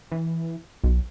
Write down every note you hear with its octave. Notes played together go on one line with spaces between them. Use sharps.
E3
B1